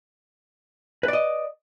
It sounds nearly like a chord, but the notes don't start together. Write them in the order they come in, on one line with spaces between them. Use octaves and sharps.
B4 D5 D#5